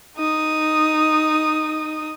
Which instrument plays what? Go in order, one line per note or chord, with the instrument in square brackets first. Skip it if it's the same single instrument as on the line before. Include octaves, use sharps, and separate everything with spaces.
[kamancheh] D#4 D#6